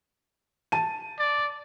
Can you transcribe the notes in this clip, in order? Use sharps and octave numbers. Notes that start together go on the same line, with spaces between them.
A5 D#7
D5